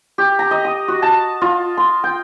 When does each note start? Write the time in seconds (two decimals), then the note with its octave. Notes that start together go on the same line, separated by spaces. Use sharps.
0.18 G4
0.39 A#5
0.51 D#5
0.65 D#6
0.88 F#4
1.02 A5
1.41 F4
1.77 C6
2.04 G5